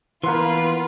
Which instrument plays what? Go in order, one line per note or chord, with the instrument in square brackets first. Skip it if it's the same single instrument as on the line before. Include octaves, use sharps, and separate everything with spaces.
[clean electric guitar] E3 B3 [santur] A#3 F#5 C6 [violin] F4 B4